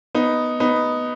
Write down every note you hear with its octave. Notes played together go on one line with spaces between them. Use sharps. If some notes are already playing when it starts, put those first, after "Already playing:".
B3 D#4
B3 D#4